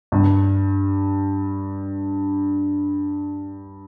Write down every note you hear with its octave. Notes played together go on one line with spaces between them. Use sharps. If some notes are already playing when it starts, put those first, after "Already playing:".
G2